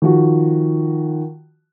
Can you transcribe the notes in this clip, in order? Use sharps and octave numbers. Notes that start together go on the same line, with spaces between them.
D#3 F3 F#4